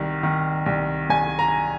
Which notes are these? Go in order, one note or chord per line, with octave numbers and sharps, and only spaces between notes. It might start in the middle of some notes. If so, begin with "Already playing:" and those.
Already playing: C2 D#3
D#3
C2
C2 G#5
A#5